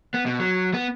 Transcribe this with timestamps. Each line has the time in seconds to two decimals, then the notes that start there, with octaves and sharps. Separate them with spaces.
0.14 B3
0.26 B2
0.40 F#3
0.74 B3